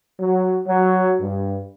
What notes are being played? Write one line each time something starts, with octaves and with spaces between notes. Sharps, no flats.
F#3
F#3
G2